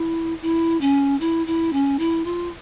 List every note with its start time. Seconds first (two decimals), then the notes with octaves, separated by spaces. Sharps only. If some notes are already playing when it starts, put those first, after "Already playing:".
Already playing: E4
0.42 E4
0.81 C#4
1.20 E4
1.47 E4
1.73 C#4
1.99 E4
2.25 F4